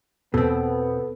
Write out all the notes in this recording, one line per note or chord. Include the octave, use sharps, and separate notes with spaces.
E2 B2 B3 C4 A4